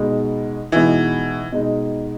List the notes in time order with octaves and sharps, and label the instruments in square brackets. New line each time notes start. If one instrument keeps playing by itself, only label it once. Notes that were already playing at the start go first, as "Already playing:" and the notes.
Already playing: [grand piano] B2 G#3 D#4
[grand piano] B2 G#3 D#4 [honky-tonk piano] E3
[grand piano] B2 G#3 D#4